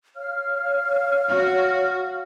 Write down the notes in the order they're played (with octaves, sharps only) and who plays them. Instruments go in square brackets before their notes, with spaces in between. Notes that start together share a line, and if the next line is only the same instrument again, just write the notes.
[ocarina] C#5 [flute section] F5 F6
[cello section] F#4